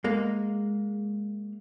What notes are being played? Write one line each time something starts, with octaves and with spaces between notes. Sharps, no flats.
G#3 A#3